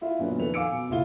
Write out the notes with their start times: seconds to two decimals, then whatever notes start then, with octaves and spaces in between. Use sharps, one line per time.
0.01 E4 F4 E5
0.19 F#2 A#2 D3 F#3 B3
0.39 F2 D#3 A4 B4 F7
0.54 F5 G#5 D6 E6 C#7 D7
0.71 B2
0.89 F#1 A#2 E4 F4 G7